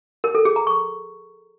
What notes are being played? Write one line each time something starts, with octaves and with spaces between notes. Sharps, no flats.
A#4
A4
G#4
A#5
C#6